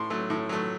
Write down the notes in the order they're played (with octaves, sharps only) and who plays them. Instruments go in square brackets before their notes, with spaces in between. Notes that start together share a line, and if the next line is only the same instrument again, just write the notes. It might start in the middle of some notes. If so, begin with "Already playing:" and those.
Already playing: [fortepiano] A2 C6
F#3 A3
A2
F#3 A3